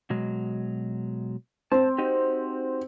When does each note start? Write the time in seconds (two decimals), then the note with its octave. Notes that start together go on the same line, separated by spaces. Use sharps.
0.10 B2 F#3 G#3
1.72 C4 A5
1.98 D#4 F#4 G4